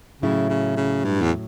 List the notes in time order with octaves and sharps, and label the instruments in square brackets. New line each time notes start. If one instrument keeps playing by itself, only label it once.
[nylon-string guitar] A2 F#3 C#4 E4 [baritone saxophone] C#3
[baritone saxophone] C#3
C#3
G2
E2